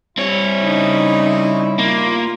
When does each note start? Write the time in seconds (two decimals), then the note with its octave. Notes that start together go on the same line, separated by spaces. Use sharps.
0.18 G3 C4 E4 C#5
0.62 C#3 D#4
1.79 A#3 F4